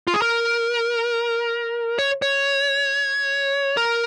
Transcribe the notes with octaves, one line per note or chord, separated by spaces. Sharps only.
F4
G#4
A#4
C#5
C#5
A#4